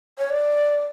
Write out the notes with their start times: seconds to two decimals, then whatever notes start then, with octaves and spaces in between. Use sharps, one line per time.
0.18 C#5
0.30 D5